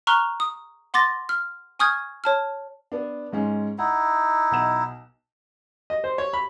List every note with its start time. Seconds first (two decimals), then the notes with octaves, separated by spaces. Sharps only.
0.07 A#5 C#6 F6 F#6 F7 G7
0.40 D#6
0.94 F#5 C6 D6 A6 A#6
1.29 F6
1.79 G#5 C#6 D#6 F6 G6 G#6
2.24 C#5 A5 F6
2.92 B3 D4
3.32 G#2 G#3 C#4
3.78 D#4 E4 F#5
4.51 B1 F#5 E7
5.90 D#5
6.04 C5
6.18 C#5
6.33 B5